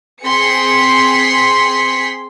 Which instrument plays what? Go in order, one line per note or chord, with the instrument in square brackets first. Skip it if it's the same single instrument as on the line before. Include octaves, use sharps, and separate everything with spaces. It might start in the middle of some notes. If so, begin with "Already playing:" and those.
[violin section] C4 G#4 C6 B6 C#7